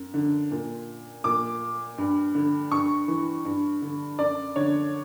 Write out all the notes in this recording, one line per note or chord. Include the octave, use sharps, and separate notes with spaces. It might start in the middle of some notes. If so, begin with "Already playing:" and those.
Already playing: F#2
D3
A#2
A#2 D6
G2
D3
G2 C#6
E3
G2
D3
F#2 D5
D3 C#5